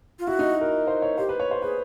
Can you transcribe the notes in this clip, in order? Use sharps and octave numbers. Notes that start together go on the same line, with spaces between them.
F4
E4 F#4
D#4
A#4
C5
C#5
G4 C5
B4
C#5
C5
G#4 B4